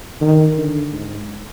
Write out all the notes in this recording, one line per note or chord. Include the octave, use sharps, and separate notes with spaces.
D#3
D3
G#2